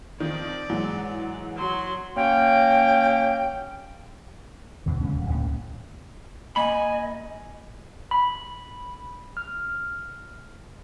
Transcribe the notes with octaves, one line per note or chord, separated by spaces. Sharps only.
D#3 F3 C4 D5
G#2 E3 F#3
F#3 C6
F#3 A#3 C#4 G5
E2 G2 B2 D3
C#3 G#3 C#4
D#1 G3
C#2 A2 A#3 C#4
A#3 D#5 G#5 B5
B5
F6